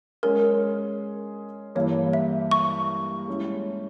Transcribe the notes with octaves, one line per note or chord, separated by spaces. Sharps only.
G#3 C#4 G#4 A#4
G2 E3 A#3 C#5
E5
C#6
G#3 C#4 E4